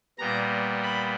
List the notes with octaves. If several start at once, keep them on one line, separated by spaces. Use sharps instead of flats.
A#2 G3 B3 A#5
B5